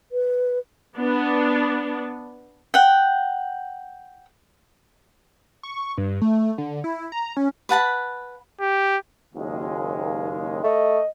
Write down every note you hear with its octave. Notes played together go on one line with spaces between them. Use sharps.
B4
B3 D4
F#5 G5
C#6
G2
A3
D3
E4
A#5
C#4
B4 F#5 A5 B5
G4
F#1 D#2 G#3
A3 D#5